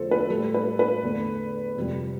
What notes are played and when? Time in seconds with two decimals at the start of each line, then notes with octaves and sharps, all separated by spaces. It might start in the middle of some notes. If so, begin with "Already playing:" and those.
Already playing: E2 D3 F3 A3 A4 C5
0.11 B4
0.30 A2 G3 A4
0.54 B4
0.79 B4
1.02 E2 D3 A3
1.77 F2 C3 G3